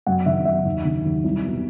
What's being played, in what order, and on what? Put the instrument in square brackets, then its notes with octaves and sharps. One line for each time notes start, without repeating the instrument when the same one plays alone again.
[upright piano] F#2 F#5
D#3 E5
F#2 E5
D#2
D#3
D#2
C2
B2